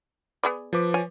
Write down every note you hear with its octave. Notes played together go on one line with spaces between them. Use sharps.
B3 G#4 D5
F3 B4 D6
C#5 G#5